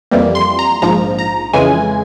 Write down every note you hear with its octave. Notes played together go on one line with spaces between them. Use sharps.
F2 E3 G3 A#3
C6
A#5
A#1 G#2 F3 A#5
A#5
F2 C#3 E3 G#3 G#5